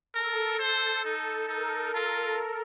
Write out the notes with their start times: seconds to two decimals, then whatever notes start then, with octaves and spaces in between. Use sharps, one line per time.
0.15 A4 A#4
0.59 A4 C5
1.05 D#4
1.49 D#4 A#4
1.94 F4